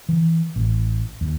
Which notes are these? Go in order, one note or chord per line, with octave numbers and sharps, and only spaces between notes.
E3
A1
D#2